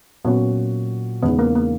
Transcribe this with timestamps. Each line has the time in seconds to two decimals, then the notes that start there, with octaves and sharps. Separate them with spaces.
0.24 A#2 F#3 B3 C#4 F#4
1.23 E2 C#3 G#3 B3 D#4
1.39 A#3
1.55 A#3